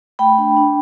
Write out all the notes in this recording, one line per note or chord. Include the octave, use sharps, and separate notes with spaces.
A3 G5 B5
D4
D4